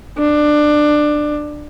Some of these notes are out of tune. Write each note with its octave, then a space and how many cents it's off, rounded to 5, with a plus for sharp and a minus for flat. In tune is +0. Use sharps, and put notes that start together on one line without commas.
D4 +20